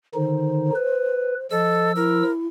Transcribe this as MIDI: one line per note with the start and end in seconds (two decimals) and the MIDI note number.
0.15 0.71 50
0.15 0.71 51
0.15 0.71 63
0.15 1.47 72
0.75 1.34 71
1.51 2.23 53
1.51 1.92 69
1.51 1.94 75
1.51 2.23 88
1.96 2.47 64
1.96 2.31 70